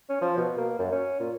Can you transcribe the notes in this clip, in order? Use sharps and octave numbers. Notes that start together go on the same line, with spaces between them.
C#4
F3
B2
A#3
F#2
C#4
A#2